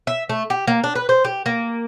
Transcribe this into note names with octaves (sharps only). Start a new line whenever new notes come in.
E5
A3
G4
A#3
D4
B4
C5
G4
A#3